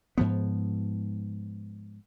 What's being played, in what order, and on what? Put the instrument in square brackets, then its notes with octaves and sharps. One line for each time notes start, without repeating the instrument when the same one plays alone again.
[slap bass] G#2 F3 B3